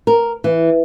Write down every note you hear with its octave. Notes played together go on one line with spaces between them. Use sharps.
A#4
E3